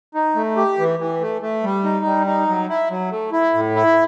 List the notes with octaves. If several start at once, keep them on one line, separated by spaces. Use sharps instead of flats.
D#4
A3
G4
E3
E3
A3
A3
G3
D#4
G3
D#4
F#3
E4
F#3
A3
E4
A2
E4